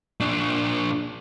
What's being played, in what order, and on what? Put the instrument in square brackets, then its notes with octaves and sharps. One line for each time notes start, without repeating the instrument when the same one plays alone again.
[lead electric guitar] A#2 D4